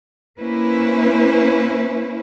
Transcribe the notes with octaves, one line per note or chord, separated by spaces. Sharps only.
A#3 C#4 E4 B4 C5